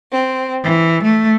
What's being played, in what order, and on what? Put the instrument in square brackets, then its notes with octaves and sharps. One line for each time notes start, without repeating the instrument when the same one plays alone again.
[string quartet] C4
E3
A3